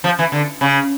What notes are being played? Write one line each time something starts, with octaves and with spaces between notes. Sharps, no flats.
F3
E3
D3
C#3